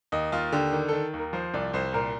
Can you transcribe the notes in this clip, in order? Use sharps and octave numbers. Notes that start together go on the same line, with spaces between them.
D#2 D#5
D#2 F4
D3 G4
D#3
D#3 A4
D#2
A#4
F3 C5
C2 D5
C2 C5
A#2 A#4